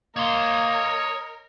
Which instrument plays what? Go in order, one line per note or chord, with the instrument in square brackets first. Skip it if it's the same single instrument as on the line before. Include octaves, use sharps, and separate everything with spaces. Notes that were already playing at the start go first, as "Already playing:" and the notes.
[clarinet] A#3 [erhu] A#4 [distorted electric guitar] C#5 C6 [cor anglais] D#5